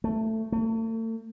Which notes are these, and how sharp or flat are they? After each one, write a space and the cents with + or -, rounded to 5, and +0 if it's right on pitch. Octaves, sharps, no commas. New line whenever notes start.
A3 +10
A3 +40